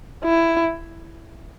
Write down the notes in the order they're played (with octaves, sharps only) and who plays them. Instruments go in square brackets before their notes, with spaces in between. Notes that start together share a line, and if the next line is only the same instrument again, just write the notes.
[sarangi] E4